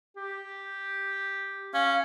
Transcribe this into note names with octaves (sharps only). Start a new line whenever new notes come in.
G4
C#4 F5